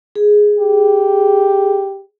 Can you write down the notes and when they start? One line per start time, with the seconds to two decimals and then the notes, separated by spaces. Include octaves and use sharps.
0.16 G#4
0.59 G4